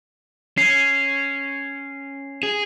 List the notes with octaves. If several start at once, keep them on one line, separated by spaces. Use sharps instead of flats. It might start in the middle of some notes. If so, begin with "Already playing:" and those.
C#4 C7
G#4